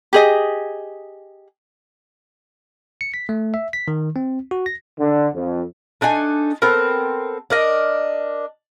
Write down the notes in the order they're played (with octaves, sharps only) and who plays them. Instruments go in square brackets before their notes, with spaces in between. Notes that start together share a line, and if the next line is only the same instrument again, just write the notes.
[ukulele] G4 G#4 D#5
[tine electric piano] C#7
B6
A3
E5
B6
D#3
C4
F#4
A#6
[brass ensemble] D3
F2
[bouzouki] A3 D4 D#4 G#5
B3 C4 A4 A#4
D4 A#4 D#5